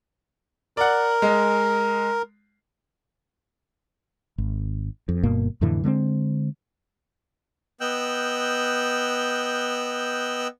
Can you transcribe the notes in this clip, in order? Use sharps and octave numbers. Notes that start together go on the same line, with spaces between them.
A#4 D5 F#5
G#3
G#1
F2
G1 G2 B2 A#3
F2 A2 D3 E3
D3 G#3 A#3 C4
B3 D#5 G5 E6 F#6 G6